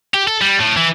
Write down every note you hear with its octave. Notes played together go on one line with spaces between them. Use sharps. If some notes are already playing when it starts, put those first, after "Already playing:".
G4
A4
G3
A2
E3